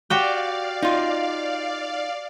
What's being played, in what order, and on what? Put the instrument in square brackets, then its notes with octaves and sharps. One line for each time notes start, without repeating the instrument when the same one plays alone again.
[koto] F#4 G4 G5 [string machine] D5 F5
[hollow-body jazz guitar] D#4 F4